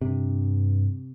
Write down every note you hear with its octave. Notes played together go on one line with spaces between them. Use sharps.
G2 C3